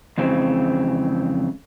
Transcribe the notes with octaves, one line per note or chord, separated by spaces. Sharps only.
F2 C#3 E3 G#3 C4